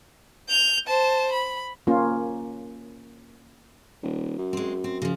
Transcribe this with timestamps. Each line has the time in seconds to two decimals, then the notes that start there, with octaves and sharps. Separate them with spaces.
0.49 G6 F7
0.87 C5 A5
1.32 B5
1.87 A#3 C#4 F4
4.03 D#1
4.38 F#2
4.53 G#3 C4
4.84 C4
5.02 C#3 F3